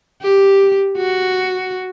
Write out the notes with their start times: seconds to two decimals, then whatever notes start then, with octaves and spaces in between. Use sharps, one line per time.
0.22 G4
0.97 F#4